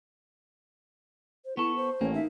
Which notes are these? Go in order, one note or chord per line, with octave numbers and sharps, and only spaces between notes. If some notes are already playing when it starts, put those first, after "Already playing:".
C5
B3 E4 A4 C#6
C5
A1 A#3 C#4
D#4 E5